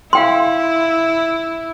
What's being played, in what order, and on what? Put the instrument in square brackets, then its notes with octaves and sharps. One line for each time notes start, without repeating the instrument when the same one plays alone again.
[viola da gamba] E4 [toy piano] F5 G5 C6